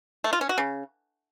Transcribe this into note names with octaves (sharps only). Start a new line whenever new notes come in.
A3
F4
C#4
F#4
C#3